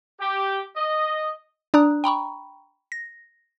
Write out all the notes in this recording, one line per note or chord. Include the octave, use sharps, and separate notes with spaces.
G4
D#5
D4 D5 A#5 D#6 F#6
G5 A#5 B5 C#6
A#6